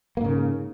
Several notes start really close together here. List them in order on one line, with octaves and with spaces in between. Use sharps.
A#3 G#2 C#3